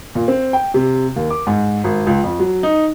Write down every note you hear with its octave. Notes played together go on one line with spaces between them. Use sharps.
A#2
C4
G5
C3
D#2
D6
G#2
G#1
C#2
F2
F#3
D#4